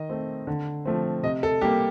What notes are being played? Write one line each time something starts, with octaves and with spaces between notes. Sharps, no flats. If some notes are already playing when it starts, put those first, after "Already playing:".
Already playing: D#3 D#5
A3 C4
D3
F3 A3 C4
C3 D#5
A4
G3 A#3 G4